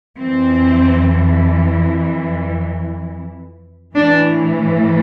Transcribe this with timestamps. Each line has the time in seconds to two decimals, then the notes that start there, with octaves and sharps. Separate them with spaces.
0.17 F2 E3 C4
3.95 A2 E3 D4